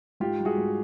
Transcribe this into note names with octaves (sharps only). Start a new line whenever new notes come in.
G#2 F4 G4
G3
F#4 G#4
G#2